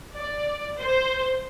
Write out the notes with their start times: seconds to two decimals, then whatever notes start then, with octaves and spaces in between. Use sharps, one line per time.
0.16 D5
0.78 C5